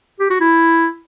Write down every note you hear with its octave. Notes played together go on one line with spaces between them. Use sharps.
G4
F#4
E4